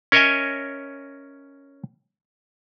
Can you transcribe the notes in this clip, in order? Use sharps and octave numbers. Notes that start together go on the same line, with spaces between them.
C#4 A#4 C#5 D#5 E5 G#5